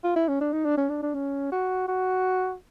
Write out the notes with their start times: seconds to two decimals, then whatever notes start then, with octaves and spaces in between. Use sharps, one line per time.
0.04 F4
0.16 E4
0.28 C#4
0.41 D4
0.53 D#4
0.65 D4
0.78 C#4
0.90 D4
1.03 D4
1.14 C#4
1.52 F#4
1.88 F#4